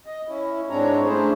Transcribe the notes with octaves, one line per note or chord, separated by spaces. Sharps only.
D#5
C#4 E4
G#2 G#3 C4 D4 C#5 A#5
A3 C#4 D4 E4 G#4 C5